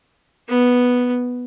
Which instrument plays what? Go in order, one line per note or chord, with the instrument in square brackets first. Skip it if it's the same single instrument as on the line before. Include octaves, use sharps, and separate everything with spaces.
[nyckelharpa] B3